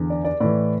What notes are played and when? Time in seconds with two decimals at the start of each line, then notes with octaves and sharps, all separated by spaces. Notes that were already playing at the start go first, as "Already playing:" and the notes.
Already playing: E2 D3
0.10 D5
0.24 D5
0.40 A2 E3 D5